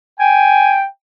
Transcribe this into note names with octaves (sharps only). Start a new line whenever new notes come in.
G5 G#5